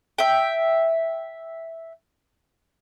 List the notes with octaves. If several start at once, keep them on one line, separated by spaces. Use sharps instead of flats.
E5 G5